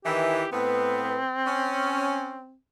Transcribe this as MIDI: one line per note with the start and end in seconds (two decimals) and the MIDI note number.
0.04 0.45 51
0.04 0.45 52
0.04 0.47 67
0.52 1.19 45
0.52 1.19 59
0.52 2.56 60
1.46 2.38 61